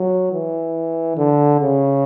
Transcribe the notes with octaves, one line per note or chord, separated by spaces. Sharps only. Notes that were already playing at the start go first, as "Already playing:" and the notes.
Already playing: F#3
E3
D3
C#3